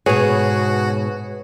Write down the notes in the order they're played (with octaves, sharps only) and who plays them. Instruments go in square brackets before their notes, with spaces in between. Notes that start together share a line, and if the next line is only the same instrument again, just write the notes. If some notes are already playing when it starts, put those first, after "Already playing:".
[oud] G#2 B2 [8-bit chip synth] F#4 [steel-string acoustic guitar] G#4 [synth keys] B4 C#5